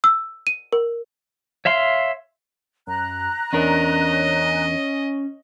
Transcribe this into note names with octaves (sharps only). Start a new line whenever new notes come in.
E6
D#7
A#4
C#5 E5 F5 C6
F#2 A#5 F#6
E2 C#4 D4 A#4 D#5